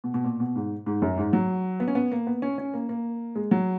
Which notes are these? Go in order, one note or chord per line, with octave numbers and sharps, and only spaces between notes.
B2
B2
A#2
B2
G#2
G#2
F#2
G#2
F#3
B3
C#4
B3
A#3
B3
C#4
C#4
A#3
A#3
G#3
F#3